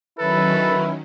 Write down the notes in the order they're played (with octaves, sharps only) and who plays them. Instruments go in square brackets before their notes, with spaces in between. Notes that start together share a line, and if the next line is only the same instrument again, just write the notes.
[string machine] D#3 F#3 C#4 [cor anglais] E4 [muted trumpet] A4 [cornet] B4